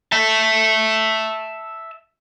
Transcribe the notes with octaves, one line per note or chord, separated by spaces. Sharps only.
E5 A5